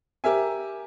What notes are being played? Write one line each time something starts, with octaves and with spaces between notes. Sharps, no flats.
G4 A#4 E5 G#5